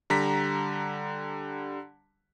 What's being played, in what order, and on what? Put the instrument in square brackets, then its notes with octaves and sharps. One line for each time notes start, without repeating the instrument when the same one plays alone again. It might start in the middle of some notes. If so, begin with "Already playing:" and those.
[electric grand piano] D3 G3 A#5 B6